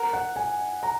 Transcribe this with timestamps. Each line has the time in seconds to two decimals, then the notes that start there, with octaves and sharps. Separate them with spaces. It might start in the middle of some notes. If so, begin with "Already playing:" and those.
Already playing: A#4 F#5
0.13 F#5
0.36 G#5
0.83 A#5